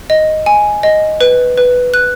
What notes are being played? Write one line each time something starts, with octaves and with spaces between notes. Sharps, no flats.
D#5
G#5
D#5
B4
B4
F#6